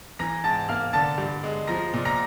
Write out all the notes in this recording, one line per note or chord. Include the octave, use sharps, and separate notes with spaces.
E3 A#5 A#6
G#2 A5 A6
A#3 F5 F6
D3 A5 A6
G2
G#3
F3 A#5 A#6
A#2
A#5 A#6